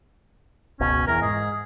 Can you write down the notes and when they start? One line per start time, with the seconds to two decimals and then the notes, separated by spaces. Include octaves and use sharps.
0.80 F#1 C#2 B2 C#4
1.07 E2 E3 A#4
1.22 G#2 G#4